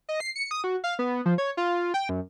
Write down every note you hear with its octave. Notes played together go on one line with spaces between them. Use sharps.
D#5
C7
C#7
D#6
F#4
F5
B3
F3
C#5
F4
G5
F#2